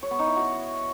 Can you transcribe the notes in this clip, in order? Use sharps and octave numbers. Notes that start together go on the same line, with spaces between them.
C#5
B3
D#4
E4
F#4